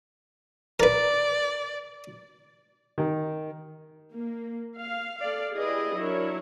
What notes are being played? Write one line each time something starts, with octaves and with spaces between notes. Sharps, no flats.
A#4 B4 D5
D#3
A#3
F5
A4 D5 F5
E4 G4 G#4 B4 D5 D#5
F#3 D4 E4 A#4 C#5